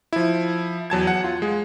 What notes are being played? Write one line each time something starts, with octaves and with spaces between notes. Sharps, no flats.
F3 E4
E2 F#3 A5 G#6
F#5
F4
G#3